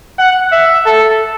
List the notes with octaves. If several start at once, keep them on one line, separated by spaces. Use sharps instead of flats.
F#5
E5
A4